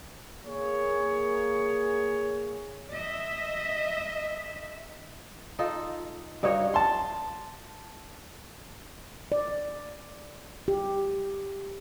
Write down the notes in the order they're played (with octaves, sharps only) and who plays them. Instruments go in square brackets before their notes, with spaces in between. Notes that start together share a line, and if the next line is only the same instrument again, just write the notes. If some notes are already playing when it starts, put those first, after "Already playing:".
[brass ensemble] A#3 G#4 C#5
[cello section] D#5 E5
[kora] D#4 F4 A4
G2 D#4 F#4 C#5
[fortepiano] A5 C6
[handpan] D5
G4